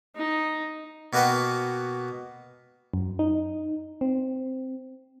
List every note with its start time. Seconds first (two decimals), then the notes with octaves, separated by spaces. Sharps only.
0.16 D#4
1.13 B2 A#3 F#4 B4 F#5 G5
2.94 F#2
3.19 D#4
4.01 C4